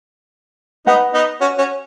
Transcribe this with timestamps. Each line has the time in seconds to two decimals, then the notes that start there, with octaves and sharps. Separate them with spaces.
0.87 B3 D#4 B4 F#5 B5
1.14 B3 D#4
1.41 C#4 F#4
1.58 C#4 F#4